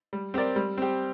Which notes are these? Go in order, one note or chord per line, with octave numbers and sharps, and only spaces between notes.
G3
C4 G4 A#4 D5
G3
C4 G4